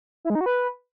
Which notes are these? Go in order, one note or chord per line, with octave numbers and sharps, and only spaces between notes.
E4
G#3
D#4
F#4
B4